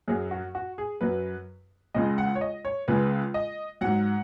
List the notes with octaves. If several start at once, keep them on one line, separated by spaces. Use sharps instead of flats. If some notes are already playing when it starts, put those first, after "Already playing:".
F#2 F#3 G#4
F#4
F#4
G#4
F#2 F#3 B4
C#2 C#3 G#3 D#5
F#5
C#5
D#5
C#5
C#2 C#3 G#3 B4
D#5
G#2 F#3 F#5